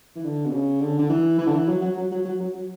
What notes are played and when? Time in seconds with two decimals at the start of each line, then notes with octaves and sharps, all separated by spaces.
0.15 E3
0.24 D3
0.46 B2
0.52 C#3
0.81 D3
0.99 D3
1.09 E3
1.38 E3
1.46 D3
1.53 E3
1.68 F#3
1.81 F#3
1.97 F#3
2.11 F#3
2.25 F#3
2.40 F#3
2.54 F#3